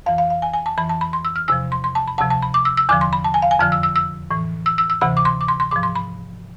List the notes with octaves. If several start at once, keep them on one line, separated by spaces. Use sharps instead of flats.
F2 E3 F5
F5
F5
G#5
G#5
A5
F2 E3 B5
A5
B5
C6
E6
F6
E2 C3 F3 E6
C6
C6
A5
B5
D2 C3 F3 A5
A5
B5
D6
E6
E6
E2 D3 F3 D6
C6
B5
A5
G#5
F5
G#5
F2 D3 F3 F6
E6
E6
E6
A2 E3
E6
E6
E6
D2 C3 E3 B5
D6
C6
D6
C6
C6
G#2 F3 D6
C6
B5